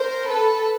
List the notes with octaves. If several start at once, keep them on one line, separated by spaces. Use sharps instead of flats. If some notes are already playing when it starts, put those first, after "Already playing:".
Already playing: A#4 C5
A4 B4